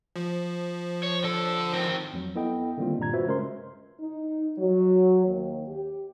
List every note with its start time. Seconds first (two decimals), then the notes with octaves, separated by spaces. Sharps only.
0.16 F3
1.03 C#5
1.24 D3 A4
1.73 D#3 C4
2.13 F2 F#3
2.35 B3 E4 A4 D#5 G5
2.78 D3 D#3 G3 A#3 C4 F4
2.99 G2 A#2 G3 A#5 G#6
3.13 F4 F#4 B4 C5 E5
3.26 C#3 G#3 C#4 A#4 C5 C6
4.00 D#4
4.58 F#3
5.26 D#2
5.68 G4